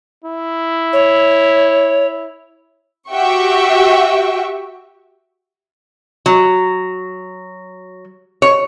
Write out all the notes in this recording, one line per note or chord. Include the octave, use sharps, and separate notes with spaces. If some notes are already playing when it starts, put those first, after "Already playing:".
E4
C#5
F#4 G4 E5 G5 C#6
F#3
C#5